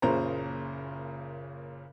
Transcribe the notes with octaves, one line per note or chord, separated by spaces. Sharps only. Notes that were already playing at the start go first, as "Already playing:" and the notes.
F#1 A#2 C#3 C5 A#5